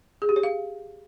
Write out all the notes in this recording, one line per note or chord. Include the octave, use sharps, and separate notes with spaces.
G#4
G4
C#5
F5